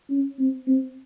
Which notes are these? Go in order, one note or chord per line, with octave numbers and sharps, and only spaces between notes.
C#4
C4
C4